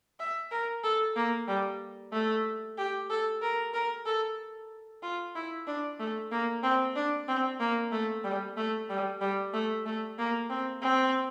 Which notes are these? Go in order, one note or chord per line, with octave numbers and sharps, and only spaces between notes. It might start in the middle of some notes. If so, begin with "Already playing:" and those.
E5
A#4
A4
A#3
G3
A3
G4
A4
A#4
A#4
A4
F4
E4
D4
A3
A#3
C4
D4
C4
A#3
A3
G3
A3
G3
G3
A3
A3
A#3
C4
C4